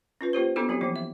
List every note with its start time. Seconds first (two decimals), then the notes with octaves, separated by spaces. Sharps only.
0.21 C#4 F4 B4
0.33 A#3 F4 G4 C5
0.56 B3 D4 E4 F#4 A4
0.69 F#3 C4 E4 G4
0.81 E3 F3 A#3 E4
0.96 E5